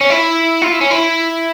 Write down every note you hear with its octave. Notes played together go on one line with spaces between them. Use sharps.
C#4
E4
F4
E4
C#4
E4